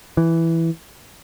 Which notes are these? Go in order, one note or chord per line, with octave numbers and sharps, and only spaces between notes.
E3